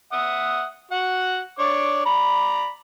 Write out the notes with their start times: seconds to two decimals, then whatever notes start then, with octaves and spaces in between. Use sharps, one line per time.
0.12 E5 F#5 D#6
0.91 F#4 F#5
1.59 D4 C#5 D6
2.05 D5 A#5 B5